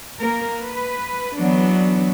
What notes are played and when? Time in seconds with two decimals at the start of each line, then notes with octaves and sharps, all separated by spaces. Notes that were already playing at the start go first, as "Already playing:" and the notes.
0.19 A#3 A#4
0.65 B4
1.38 E3 F#3 B3 D4